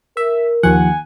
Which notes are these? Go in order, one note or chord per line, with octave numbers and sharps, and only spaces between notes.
A#4 E5
D#2 F3 F#5 G#5